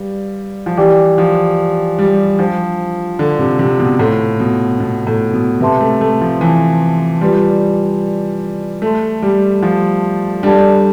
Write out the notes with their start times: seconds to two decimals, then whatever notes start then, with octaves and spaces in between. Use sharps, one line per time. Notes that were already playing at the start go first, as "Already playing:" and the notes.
Already playing: G3 B4 D5 F5
0.66 F3
0.77 E3 G4 D5 G5 D6
1.18 F3
1.99 G3
2.39 F3 D4 F4 C5 G5
3.19 D3
3.39 C3
3.59 C3
3.80 B2
3.99 A2 F4 C5 F5 C6
4.40 B2
4.80 B2
5.07 A2
5.34 B2
5.61 C3 B4 E5 A5 C6
5.81 A3
6.01 A3
6.21 F3
6.41 E3
7.21 G3 F4 B4 D5 A5 C6
8.82 A3 A4 E5 A5 C6
9.22 G3
9.63 F3
10.43 G3 D4 A4 D5 A5